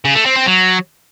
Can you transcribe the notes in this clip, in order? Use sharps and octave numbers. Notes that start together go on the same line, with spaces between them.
C#3
A3
C4
C4
F#3